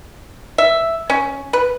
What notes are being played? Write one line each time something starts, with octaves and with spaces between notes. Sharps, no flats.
E5
C#4
B4